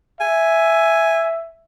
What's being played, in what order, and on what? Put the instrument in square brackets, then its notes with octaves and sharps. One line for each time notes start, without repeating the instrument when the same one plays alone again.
[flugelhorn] E5 [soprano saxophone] G#5